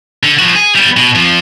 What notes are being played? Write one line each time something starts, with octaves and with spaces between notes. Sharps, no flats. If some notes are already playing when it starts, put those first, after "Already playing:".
D3
F3 F#4
G#4
G3 B3
B2
F2 F3